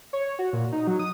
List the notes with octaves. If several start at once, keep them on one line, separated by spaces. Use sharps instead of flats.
C#5
F#4
A#2
D#4
F#3
D#6